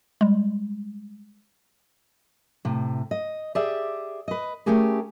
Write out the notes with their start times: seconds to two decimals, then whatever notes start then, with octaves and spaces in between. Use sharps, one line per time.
0.21 G3 G#3
2.65 A2 C3
3.11 D#5
3.55 G4 G#4 D5 E5
4.28 B4 D#5
4.66 A3 C#4 G4 G#4 A#4